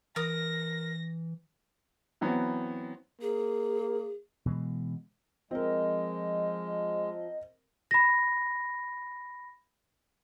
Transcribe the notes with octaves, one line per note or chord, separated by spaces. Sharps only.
E3 A#4 D#6 A#6
E3 F#3 B3 C4
A#3 G#4
B2 E3 G#3
F3 G#3 C4 A#4 D#5
B5 A#6